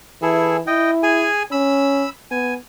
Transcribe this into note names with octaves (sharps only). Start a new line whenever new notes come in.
E3 E4 G#4 A4
E4 D#5 G5
G#4 G#5
C#4 B5 E6
B3 G#5